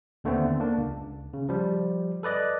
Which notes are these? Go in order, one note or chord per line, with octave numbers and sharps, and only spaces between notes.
D#2 D3 A3 B3 C4
A#3 D4
C#2
C#3
F3 G3
A4 B4 D5 D#5